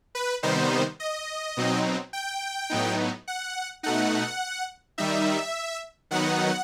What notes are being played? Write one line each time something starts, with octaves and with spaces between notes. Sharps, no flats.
B4
C3 D#3 G3 B3 D#4 C5
D#5
B2 F#3 C4 D#4
G5
A2 F#3 B3 D#4
F#5
B2 A3 D#4 F#5
D#3 G3 D#4 E5
D#3 F#3 B3 D#4 F#5